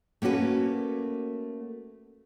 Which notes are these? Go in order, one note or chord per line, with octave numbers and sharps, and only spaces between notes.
A3 A#3 C#4 F#4 B4